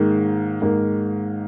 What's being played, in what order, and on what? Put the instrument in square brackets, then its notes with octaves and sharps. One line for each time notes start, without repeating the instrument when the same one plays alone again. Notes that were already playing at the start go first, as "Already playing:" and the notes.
Already playing: [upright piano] G#2 D#3 A#3
G#2 D#3 A#3